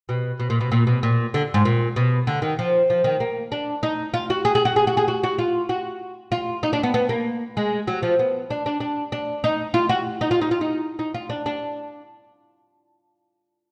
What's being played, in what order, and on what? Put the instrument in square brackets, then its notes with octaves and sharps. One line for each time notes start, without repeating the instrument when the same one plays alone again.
[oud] B2
B2
A#2
B2
A#2
B2
A#2
D3
G#2
A#2
B2
D3
D#3
F3
F3
D#3
A#3
D4
D#4
F4
F#4
G#4
G#4
F#4
G#4
F#4
G#4
F#4
F#4
F4
F#4
F4
D#4
D4
B3
B3
A#3
G#3
F#3
F3
B3
D4
D4
D4
D4
D#4
F4
F#4
D#4
F4
D#4
F4
D#4
D#4
F4
D4
D4